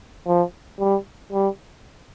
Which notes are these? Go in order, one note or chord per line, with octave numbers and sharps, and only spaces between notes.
F3
G3
G3